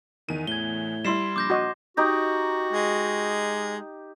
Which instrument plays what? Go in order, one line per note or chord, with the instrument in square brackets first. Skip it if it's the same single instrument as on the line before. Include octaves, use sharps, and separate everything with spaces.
[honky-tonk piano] E2 D#7 [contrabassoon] D#3
[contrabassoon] A2 [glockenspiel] G#6 G7
[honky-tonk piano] G3 E4 [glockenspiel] C6 C7 E7
[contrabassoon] A#1 [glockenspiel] D6 G6 A#6
[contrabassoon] A#1 [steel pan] F#4 D#5
[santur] D#4 G4 A#5 [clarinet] F#4
[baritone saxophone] G#3